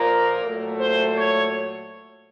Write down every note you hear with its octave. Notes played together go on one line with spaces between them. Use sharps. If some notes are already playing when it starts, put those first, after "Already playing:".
Already playing: A#2 F3 A#3 A#4
A#2 F#3 A3
C5
C#5